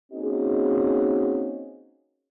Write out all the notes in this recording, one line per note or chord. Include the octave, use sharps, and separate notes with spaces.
A#3 C4 C#4 D#4 F#4 G#4